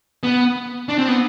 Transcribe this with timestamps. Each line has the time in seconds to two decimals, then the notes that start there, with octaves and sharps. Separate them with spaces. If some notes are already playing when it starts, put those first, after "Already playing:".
0.23 B3
0.89 D4
0.98 C4
1.08 B3